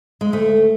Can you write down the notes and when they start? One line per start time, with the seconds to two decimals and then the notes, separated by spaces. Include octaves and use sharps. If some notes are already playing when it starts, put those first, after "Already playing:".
0.21 G#3
0.32 D2 A3